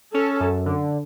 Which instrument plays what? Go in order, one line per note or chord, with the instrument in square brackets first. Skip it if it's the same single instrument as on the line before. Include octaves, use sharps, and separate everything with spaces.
[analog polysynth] C#4 [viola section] A4
[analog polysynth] F#2
D3